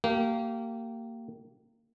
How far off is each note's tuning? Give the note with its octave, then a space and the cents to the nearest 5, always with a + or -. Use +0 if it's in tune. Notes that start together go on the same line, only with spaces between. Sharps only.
A#3 -25 G4 -25